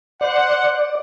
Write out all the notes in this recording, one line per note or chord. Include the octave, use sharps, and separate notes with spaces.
C5 D5 F#5